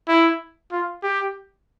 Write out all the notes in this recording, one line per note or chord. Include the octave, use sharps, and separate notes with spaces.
E4
F4
G4